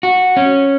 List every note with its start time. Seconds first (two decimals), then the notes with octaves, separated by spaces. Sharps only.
0.03 F#4
0.37 C#4